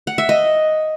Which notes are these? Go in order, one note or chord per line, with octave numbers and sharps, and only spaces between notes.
F#5
E5
D#5